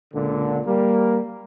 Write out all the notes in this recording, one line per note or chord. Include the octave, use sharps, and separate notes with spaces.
C#2 A#2 D3
G3 A#3